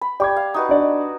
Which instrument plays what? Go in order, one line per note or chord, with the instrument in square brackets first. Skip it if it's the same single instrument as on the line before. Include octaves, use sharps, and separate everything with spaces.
[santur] B5
[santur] G4 [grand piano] D5 D6 G#6
[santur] F5
D#4 F#4 B4
[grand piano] D4 D5 D#5